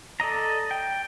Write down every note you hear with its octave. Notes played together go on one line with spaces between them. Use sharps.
A4 D5 D#5 A#5
G5